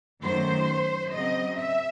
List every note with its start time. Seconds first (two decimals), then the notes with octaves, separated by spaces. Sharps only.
0.22 F#2 D#3 F#3 A3 C5
1.12 C#3 F#3 C4 D#5
1.57 E5